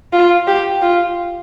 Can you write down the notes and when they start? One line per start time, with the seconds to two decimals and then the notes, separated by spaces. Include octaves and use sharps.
0.13 F4
0.47 G4
0.82 F4